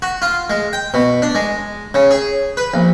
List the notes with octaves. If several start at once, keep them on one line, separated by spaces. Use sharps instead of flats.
F#4
F4
G#3
G5
B2
D4
G#3
C#3
G#4
B4
A#1